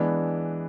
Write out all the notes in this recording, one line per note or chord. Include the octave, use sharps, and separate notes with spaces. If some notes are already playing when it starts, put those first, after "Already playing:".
Already playing: E3 G#3 B3 D4